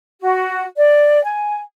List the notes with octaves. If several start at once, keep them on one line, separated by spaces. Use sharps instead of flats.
F#4
D5
G#5